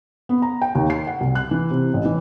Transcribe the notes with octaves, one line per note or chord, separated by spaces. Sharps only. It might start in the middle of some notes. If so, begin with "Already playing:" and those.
B3
A#5
G5
D#2
C7
F#5
C2
F#6
E3
C3
A1
E3